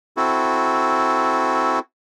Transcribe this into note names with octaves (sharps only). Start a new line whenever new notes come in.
C4 E4 F#4 A4